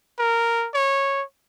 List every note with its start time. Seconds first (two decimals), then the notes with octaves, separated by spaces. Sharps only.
0.19 A#4
0.74 C#5